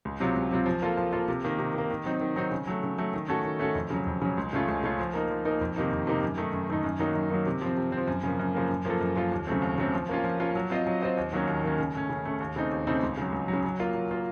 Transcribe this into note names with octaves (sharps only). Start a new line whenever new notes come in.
C#2
C3 F#3 C4 F4
C#2
C3 F#3 C4 F4
F3
A#3 F4 A4
F3
A#3 F4 A4
C3
D#3 A#3
C3
D#3 A#3
D#3
F#3 C4 D#4
D#3
F#3 C4 D#4
C#3
F#3 A3
C#3
F#3 A3
D#3
A3 C#4 F#4 A4
D#3
A3 C#4 F#4 A4
F2
C#3 F#3
F2
C#3 F#3
C#2
C#3 A3 C#4 F4
C#2
C#3 A3 C#4 F4
F3
A#3 D#4 A#4
F3
A#3 D#4 A#4
F2
C3 D#3 A#3 D#4
F2
C3 D#3 A#3 D#4
F#2
D#3 A3 D#4
F#2
D#3 A3 D#4
F#2
D#3 F#3 A#3 D#4
F#2
D#3 F#3 A#3 D#4
C3
F3 C4
C3
C4
F3
F#2
C#3 F3 A#3
F#2
C#3 F3 A#3
F#2
F3 A#3 F4 A4
F#2
F3 A#3 F4 A4
D#2
C#3 F#3 A3 C4
D#2
C#3 F#3 A3 C4
F3
A#3 C#4 F4
F3
A#3 C#4 F4
F#3
C4 F4 C5 D#5
F#3
C4 F4 C5 D#5
D#2
D#3 F#3 A#3 C#4
D#2
D#3 F#3 A#3 C#4
C#3
A3 C#4
C#3
A3 C#4
D#2
C#3 A3 C4 D#4
D#2
C#3 A3 C4 D#4
C#2
C#3 F#3
C#2
F#3
C#3
F#3
A#3 F4
F#3
A#3 F4